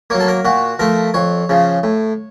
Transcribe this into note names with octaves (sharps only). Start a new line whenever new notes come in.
F#3 A#3 C#5
A4
A#4
A#2 F#4
F3 A3 A#4
F2 C#5
C#3 F3
A2